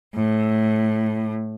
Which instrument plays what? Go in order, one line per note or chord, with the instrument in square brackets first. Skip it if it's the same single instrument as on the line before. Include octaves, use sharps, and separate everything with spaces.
[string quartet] A2